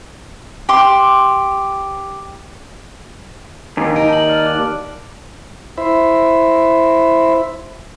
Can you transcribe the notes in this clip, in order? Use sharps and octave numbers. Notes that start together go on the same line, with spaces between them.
G4 C6 D6
D#2 G#5 A#5
D#4 D7
A5 F#7
D5 F6
D6 F#6
E4 C5 E5 B5